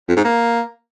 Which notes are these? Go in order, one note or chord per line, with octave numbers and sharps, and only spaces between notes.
F2
G#2
A#3